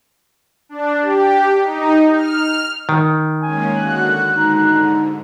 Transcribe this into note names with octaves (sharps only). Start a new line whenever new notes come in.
D4
G4
D#4
F6
D#3
G#3 A#3 C#4 G#5
D3 F#4 F#6
G#2 D3 D#4